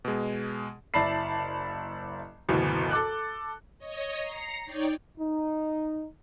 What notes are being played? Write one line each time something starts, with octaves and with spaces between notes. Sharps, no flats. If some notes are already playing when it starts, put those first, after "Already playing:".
B2 G#3
F#1 E4 D5 A5 B5 C7
F#1 D2 B2 E3
A4 D6 F#6
C#5 D#5
A#5 C7 C#7
D#4 C#5 D5 G5
D#4